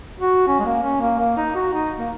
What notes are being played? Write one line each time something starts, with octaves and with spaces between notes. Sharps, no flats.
F#4
C#4
G#3
A#3
C#4
A#3
A#3
D#4
F#4
D#4
A#3